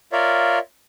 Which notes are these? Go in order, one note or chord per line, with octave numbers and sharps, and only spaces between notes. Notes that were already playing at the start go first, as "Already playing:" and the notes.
F4 A#4 C#5 D5 E5 F5